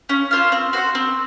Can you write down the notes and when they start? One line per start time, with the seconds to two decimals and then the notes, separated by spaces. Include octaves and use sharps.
0.09 C#4
0.31 F4 C5 F5
0.52 C4
0.73 F#4 C5 F#5
0.95 C4